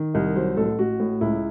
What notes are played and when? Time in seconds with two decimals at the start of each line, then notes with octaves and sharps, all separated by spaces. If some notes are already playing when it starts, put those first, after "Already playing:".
Already playing: D#3
0.14 C2 D#5
0.36 F#3 C5
0.57 A1 A4
0.79 A1 F#4
1.00 A2
1.21 C#2 E4